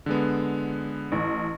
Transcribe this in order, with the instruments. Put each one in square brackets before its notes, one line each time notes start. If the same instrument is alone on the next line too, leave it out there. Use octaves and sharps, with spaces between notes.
[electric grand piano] D3 G#3 B3
[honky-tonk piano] A1